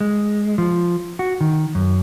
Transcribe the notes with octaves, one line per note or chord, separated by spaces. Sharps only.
G#3
F3
F#4
D#3
F#2